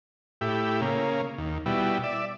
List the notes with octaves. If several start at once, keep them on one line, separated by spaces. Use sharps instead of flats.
A2 E4 G4
C#3 A#3
D#2
B2 G3 E4
D5 E5